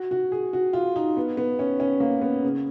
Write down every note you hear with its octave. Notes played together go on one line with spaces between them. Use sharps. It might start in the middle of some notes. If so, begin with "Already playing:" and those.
Already playing: F#4
F#4
G#4
F#4
F4
D#4
B3
B3
C#4
C#4
A#3
B3
C#3